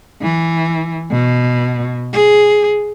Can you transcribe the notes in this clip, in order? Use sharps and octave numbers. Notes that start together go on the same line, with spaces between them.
E3
B2
G#4